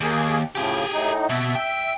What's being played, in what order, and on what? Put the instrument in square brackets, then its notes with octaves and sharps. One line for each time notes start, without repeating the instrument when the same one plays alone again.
[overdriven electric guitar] D#2 [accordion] A#3 G#4
[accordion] A2 C#3 F3 [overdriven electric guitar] G4 G#4
[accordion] A2 D#4
[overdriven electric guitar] B2 [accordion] E5
[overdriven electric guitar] G5